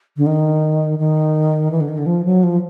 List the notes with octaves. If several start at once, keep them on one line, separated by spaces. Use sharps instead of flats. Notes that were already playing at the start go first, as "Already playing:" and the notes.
D3
D#3
D#3
E3
D3
D#3
D3
F3
F#3
F3